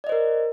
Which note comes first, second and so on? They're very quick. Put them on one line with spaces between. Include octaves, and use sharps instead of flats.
D5 D#5 C5 A#4